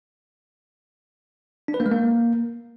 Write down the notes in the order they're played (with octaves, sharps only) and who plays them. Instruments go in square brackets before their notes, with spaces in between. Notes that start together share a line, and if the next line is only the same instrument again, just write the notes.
[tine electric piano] D4
B4
A#3
G#3
A#3